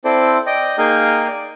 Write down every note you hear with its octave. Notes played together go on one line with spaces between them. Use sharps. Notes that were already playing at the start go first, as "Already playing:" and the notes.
C4 E4 A4 C5 D5
D5 D#5 G5
A#3 D#4 G#4 F5 G5 G6
D5